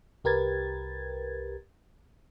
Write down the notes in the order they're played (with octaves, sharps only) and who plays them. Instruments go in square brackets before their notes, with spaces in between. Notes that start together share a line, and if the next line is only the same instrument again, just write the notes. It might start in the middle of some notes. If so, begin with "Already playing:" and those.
[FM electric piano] C2 G4 A#4 B4 G#6 A6